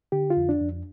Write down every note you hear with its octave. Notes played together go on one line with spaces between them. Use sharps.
D3 G4
F4
F2
D4
F2